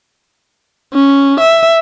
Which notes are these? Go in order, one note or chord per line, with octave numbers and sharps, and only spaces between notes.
C#4
E5